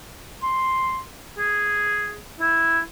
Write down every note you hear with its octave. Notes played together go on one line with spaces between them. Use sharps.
C6
G#4
E4